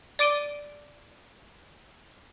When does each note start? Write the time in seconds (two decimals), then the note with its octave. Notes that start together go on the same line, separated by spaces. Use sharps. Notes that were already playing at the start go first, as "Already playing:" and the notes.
0.19 D5 D6 D7 D#7 G7